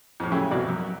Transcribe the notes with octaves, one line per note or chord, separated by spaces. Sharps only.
F2 A2
C#3 F#3 A3 C#4 E4 G4
C2 F2 B2 F#4 D5
F#2